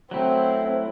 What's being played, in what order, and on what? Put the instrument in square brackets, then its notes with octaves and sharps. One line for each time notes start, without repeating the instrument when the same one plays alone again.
[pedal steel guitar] F#3 A3 E4 [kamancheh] C4